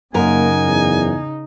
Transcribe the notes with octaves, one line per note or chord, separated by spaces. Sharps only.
F#2 C#3 A#3 D#4 A#4 G#5
E2